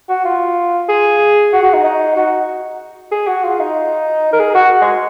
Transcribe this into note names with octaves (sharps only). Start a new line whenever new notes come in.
F#4
F4
G#4
F#4
F#4
D#4
D#4
F#4
G#4
F#4
F4
D#4
A#4
G#4
F#4
G#3